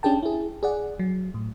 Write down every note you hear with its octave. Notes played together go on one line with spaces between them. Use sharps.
C#4 D4 G4 G#4 G5 A5
E4 G#4
G#4 D5 F#5
F#3
A2